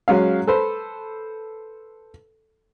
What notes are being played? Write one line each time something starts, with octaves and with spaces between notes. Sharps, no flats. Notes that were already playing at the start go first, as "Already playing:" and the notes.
F#3 G#3 C#4 F5
A4 B4 C5